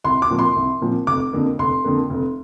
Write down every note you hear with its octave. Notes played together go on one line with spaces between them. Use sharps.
C2 C6
D6
A#2 F3 C4
C6
C2
A#2 F3 C4
F1 D6
F2 D3 A#3
F1 C6
F2 D3 A#3
F1